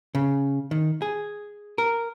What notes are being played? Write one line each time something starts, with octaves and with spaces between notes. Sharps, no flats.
C#3
D#3
G#4
A#4